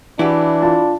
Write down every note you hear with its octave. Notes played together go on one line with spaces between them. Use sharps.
E3 D4 E4 F#4 G4
F4 A5